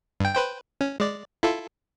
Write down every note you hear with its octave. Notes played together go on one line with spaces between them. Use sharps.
G2 G5
B4 C5 G5
C#4
G#3 D5
E4 F4 A4